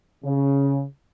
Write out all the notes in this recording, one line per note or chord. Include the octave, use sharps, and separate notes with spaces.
C#3